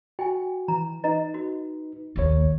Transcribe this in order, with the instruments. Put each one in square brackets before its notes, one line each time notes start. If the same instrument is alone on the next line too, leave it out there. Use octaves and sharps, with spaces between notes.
[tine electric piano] F#4 [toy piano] G5 G#5
[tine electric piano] E3 [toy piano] A#5
[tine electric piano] D#4 B4 [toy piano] D#5 A#5
[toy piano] F#4
[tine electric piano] A#1 C#5 [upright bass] D#2 A#3